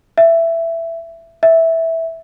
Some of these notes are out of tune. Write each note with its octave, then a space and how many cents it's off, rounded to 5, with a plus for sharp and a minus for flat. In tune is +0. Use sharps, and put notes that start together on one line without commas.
E5 +10
E5 -10